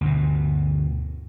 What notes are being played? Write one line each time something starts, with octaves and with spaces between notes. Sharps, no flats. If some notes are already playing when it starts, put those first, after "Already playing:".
D2 G2 B2